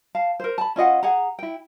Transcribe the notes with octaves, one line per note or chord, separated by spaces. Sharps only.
F5 A5
A#4 C5
A5 B5
C#4 F4 D#5 F#5
G#4 F#5 A#5
E4 G5